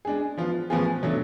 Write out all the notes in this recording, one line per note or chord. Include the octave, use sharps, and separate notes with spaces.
G#3 D4 G#4
F3 B3 F4
A2 F3 B3 F4 G#4
B2 F#3 A3 D4